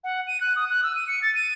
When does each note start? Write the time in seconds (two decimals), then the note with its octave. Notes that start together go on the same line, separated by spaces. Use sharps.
0.04 F#5
0.27 D#7
0.41 F#6
0.56 D#6
0.70 F#6
0.83 E6
0.96 D#7
1.08 C#7
1.22 A6
1.35 D#7